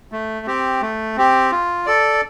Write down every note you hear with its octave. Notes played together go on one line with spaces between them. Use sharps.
A3
C4 G4
A3
C4 G4
F4
A4 D5